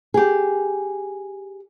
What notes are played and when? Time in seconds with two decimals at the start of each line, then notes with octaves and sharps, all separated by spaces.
0.14 G4 G#4